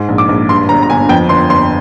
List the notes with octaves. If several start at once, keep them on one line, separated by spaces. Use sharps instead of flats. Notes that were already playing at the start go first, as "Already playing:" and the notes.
Already playing: G#2
A#1
D6
A#1
G2 C6
G1 A#5
A#5
G1 G#5
F2 G5
G1 C6
G1 C6